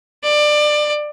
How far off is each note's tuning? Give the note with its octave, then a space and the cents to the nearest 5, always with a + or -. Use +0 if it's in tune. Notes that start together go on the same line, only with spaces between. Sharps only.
D5 +20